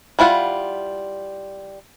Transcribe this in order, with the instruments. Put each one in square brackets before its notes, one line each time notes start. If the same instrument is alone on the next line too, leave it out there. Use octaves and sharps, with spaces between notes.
[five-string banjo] G3 E4 F4 F#5